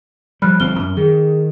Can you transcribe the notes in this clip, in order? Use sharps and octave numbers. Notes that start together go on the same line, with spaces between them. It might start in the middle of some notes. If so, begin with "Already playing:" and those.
F3 G3 B5 F6 F#6
G1 F3 C4 F6 G7
F#2
D#3 G#4